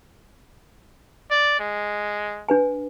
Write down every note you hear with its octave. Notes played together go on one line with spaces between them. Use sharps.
D5
G#3
D4 B4 G#5